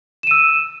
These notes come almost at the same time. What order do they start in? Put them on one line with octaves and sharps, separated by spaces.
E7 D#7 E6